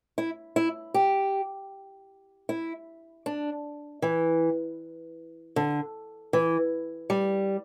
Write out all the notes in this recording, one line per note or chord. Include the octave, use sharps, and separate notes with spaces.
E4
E4
G4
E4
D4
E3
D3
E3
G3